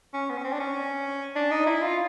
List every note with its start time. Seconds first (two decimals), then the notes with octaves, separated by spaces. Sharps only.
0.14 C#4
0.30 B3
0.38 C#4
0.44 C4
0.53 D4
0.60 C#4
1.36 D4
1.51 D#4
1.67 E4
1.82 F4